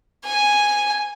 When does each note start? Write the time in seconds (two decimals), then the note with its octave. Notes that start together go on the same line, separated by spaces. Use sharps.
0.25 G#5